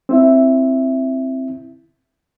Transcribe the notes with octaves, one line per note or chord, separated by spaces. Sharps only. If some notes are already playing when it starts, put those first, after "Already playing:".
C4 E4 E5